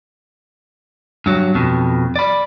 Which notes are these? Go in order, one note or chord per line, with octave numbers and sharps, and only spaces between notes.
G2 F#3
F2 B2
D5 B5